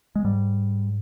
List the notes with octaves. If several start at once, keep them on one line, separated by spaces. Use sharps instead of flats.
G#3
G#2 G3